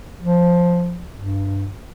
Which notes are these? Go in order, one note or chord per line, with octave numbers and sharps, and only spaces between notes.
F3
G2